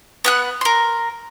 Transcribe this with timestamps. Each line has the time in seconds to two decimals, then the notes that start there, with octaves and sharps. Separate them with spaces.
0.24 B3 F#5 F#6
0.61 A#4 C6